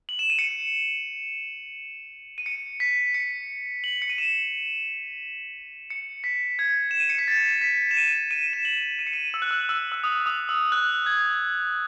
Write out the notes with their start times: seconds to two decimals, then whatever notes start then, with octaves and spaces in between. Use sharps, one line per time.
0.09 F#7
0.19 E7
0.30 D#7
0.39 C#7
2.38 D#7
2.46 C#7
2.80 B6
3.14 C#7
3.84 F#7
4.02 C#7
4.09 D#7
4.18 E7
5.90 C#7
6.24 B6
6.59 G#6
6.91 E7
7.00 D#7
7.09 C#7
7.19 B6
7.28 A6
7.61 B6
7.91 E7
7.97 D#7
8.31 D#7
8.53 E7
8.65 F#7
8.99 D#7
9.07 C#7
9.13 D#7
9.34 E6
9.42 F#6
9.51 E6
9.69 E6
9.92 E6
10.04 D#6
10.26 D#6
10.49 E6
10.72 F#6
11.06 G#6